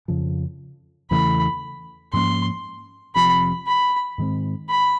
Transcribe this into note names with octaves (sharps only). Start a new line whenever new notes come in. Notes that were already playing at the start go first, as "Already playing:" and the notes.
F2 C#3 F3
E2 C#3 E3 A3 B5
G#2 F3 A#3 C#4 C6
F1 F2 C3 F3 B5
B5
G#2 D#3 G#3 C4
B5